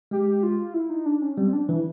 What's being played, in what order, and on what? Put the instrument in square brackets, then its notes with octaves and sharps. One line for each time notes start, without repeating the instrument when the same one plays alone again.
[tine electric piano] G#3 [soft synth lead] G4
[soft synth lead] F4
E4
D#4
D4
C#4
[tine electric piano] G3 [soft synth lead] C4
[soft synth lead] D4
[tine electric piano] E3 [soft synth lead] E4